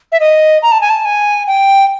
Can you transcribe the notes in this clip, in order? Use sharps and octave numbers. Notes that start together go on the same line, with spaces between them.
E5
D#5
A#5
A5
G#5
A5
G#5
G5